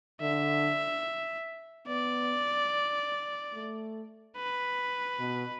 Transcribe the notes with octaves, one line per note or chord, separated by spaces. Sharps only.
D3 E5
B3 D5
A3
B4
B2